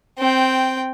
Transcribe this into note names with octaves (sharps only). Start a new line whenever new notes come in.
C4 G5